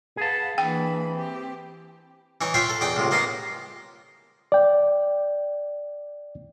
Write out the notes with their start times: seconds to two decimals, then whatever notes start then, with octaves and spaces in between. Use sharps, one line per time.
0.17 G#4 B4 F5 F#5 A5
0.58 E3 A#3 D4 G5 B5
1.10 C4 G4
2.41 E3 D#4 C#5
2.54 F4 C5 C#5 E5 F#5 G5
2.70 A4
2.81 E2 D#4 F#5 G5 D6
2.96 C#2 A2 C3
3.11 A#3 B3 D#4 D#5 F5
4.52 D5 G5